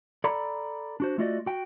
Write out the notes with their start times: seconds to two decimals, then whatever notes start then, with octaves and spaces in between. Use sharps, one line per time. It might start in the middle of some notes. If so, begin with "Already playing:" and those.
0.24 A4 D5 A#5 B5
1.00 D4 F#4 C5
1.18 A3 F4 F#4 D5 D#5
1.46 F#4 G5